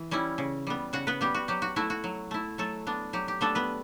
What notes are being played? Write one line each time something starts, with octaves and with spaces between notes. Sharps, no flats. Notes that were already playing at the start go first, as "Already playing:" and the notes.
Already playing: E3
G3 C#4 E4
C#3
G3 B3
C#3 F#4 F#5
B3 B4
G3 B3 G4
F#4
F#3 G4
F#4
A3 E4 F#4
F#4
F#3
A3 E4
F#3 A3 A4
B3 D4
F#3 G4
G4
A3 B3 D4 A4
B3 B4